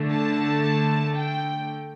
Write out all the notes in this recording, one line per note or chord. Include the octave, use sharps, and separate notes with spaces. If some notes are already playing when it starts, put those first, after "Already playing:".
Already playing: D3 A3
A5
G5